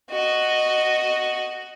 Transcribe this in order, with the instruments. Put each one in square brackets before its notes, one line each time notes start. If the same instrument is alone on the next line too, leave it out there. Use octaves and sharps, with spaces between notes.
[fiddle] F#4 D#5